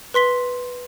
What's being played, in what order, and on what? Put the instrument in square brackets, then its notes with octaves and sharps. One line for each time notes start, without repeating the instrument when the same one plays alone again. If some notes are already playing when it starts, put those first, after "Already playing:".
[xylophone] B4 C6 B6 G7